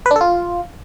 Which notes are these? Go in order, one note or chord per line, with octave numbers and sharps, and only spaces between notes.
B4
D4
A4
F4